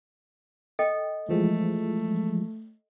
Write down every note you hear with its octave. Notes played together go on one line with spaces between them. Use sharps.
A4 D#5 G5
E3 F3 G#3 A3